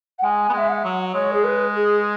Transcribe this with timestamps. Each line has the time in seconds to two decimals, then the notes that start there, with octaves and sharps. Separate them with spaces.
0.18 F#5
0.23 G#3 G#5
0.49 B3
0.53 G#3 E5
0.69 F#5
0.84 F#3
1.14 G#3 C#5
1.33 G#4
1.44 B4
1.74 G#4